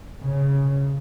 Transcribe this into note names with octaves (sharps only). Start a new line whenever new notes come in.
C#3